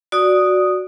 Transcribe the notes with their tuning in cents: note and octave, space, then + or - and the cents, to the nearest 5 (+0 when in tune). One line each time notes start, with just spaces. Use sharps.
F#4 -5 D5 +0 D#6 +0